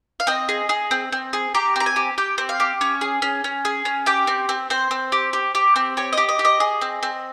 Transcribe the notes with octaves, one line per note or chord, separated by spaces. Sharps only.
F5
C4 D#5
G#4
G#4
C4
C4
G#4
G4 A#5
C4 A#5
G#5
G4
G4 G5
C4
F5
G4
C#4 C#5
G#4
C#4
C#4
G#4
C#4
G4 G5
C4
C4
C4 C5
C4
G4
G4
G4
C4
G4 C#5
G4 D#5
D#5
G4
D#5
G#4
C4
C4